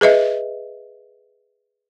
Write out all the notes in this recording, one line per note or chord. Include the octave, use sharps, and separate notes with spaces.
G#4 B4 D#5 E5